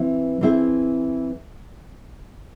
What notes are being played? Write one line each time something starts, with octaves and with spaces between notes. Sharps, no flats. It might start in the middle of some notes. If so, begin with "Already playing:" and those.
Already playing: E3 C4 E4
E3 C4 E4 G#4